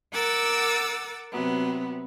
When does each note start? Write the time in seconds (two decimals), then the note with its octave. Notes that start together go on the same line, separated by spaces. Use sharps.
0.12 A#4 F#5 D6 E6 A6
1.31 C3 F#3 B3